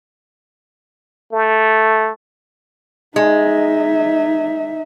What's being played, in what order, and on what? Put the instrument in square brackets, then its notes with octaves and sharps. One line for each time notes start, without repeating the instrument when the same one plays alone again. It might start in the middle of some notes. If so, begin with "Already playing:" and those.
[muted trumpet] A3
[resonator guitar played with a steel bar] G#3 [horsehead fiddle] D#4 E5